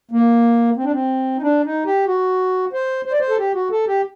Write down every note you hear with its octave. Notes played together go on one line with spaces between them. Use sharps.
A#3
C4
D4
C4
D#4
D4
D#4
G4
F#4
C5
C5
D5
C5
A4
G4
F#4
A4
G4